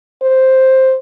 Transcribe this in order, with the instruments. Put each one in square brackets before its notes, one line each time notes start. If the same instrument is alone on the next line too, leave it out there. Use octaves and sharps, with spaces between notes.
[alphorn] C5